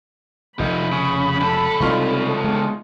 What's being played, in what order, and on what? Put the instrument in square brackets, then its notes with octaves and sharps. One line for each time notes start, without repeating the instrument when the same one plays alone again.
[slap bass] F1 [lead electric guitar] F3 D#4 [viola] B5
[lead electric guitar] C#3
C#2 A4
[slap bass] C3 G3 C4 [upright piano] D#4 F4 C#6
[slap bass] G#3 B3